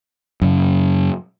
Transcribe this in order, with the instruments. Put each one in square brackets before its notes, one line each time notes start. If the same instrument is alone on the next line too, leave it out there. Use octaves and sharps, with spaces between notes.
[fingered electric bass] F#2 C#3